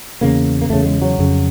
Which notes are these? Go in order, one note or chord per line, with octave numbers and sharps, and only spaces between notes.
E2 C#3 A#3
A#3
E2 C#3 A3
G#3
F#3
F2 C#3